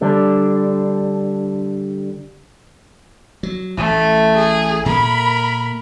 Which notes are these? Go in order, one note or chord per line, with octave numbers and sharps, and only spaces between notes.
D3 G3 D4
F#3
A1 A2 A3
G#4
A#2 A#3 A#4 B5